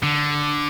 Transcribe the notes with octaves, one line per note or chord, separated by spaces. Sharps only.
D3